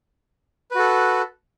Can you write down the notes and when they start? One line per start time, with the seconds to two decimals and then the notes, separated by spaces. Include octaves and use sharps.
0.71 B4
0.75 F#4
0.79 A4